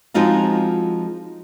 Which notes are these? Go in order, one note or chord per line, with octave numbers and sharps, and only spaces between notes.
F3 G#3 C4 D#4 F4 F#4